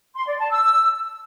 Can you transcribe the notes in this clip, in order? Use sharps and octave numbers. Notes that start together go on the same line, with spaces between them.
C6
D5
A5
E6